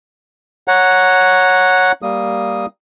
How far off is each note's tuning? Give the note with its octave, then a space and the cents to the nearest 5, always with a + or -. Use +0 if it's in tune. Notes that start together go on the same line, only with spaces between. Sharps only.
C#5 +0 F#5 -5 A#5 +0
G3 +0 A#3 +0 D#6 +0